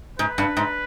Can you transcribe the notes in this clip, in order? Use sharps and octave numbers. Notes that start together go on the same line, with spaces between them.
G#2 B4
G2
G#2